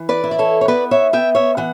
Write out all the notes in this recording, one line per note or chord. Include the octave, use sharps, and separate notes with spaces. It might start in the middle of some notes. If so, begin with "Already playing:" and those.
Already playing: E3
B4 D5
E4
D5
A4 C#5
C#5
B3 B4 D5
C#5 E5
B3 E5 G5
C#5 E5
E3 F#5